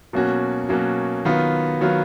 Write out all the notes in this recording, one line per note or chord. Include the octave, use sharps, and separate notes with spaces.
B2 F#3 A#3 C#4 F#4
B2 F#3 A#3 C#4 F#4
D#3 F#3 B3 F4
D#3 F#3 B3 F4